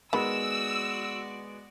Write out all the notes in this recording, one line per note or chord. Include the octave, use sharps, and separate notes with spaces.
D#3 G#3 B3 F#4 D5 B5 E6